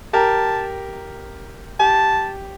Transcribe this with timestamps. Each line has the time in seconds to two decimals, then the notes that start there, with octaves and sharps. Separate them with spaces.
0.13 G4 A#4 A5
1.80 G4 A5